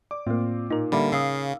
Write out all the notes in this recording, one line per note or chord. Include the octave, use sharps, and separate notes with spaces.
D5 D6
A2 A#3 C4 F4
A#2 D#4 A#4
D3 G3 A#3 E5 B5
C#3 F5 D#6 E6 C7